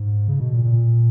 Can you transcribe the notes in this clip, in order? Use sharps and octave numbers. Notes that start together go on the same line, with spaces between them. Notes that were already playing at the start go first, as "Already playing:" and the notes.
Already playing: G#2
C#3
B2
A#2
A#2